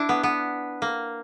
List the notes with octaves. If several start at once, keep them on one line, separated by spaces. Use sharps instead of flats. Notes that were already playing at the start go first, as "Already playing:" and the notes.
Already playing: D4 E4
B3
B3
A#3